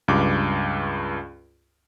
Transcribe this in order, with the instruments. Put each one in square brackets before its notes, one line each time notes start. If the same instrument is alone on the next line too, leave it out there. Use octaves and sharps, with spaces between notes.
[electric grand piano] C#2 G2 D6